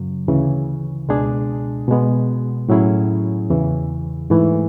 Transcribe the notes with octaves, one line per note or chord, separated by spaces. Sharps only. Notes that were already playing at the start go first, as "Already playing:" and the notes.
Already playing: F#2 C#3 F#3
D2 C#3 E3
C#2 B2 G#3 D4 G#4
B2 G#3 B3
A2 F#3 C#4 E4 G#4
E2 C#3 E3
G#2 E3 A3